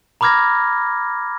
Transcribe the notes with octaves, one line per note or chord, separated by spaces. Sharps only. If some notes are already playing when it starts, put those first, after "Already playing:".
A#5 B5 D6 F6 G#6 A#6